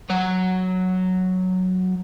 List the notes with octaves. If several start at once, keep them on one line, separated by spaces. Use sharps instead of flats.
F#3 C#5